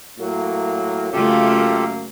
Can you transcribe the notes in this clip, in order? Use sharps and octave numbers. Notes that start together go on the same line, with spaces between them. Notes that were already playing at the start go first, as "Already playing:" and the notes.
A2 F#3 A#3
F#2 C#3 A3 A#3 F4 G4 A4